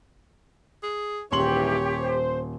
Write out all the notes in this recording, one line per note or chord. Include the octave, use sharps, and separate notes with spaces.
G#4
D#1 D#2 G#2 E3 G4 C#5 C6 F#7
C5